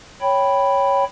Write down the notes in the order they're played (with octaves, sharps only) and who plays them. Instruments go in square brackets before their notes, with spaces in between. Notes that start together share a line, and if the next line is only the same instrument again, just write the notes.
[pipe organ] C#5 G5 B5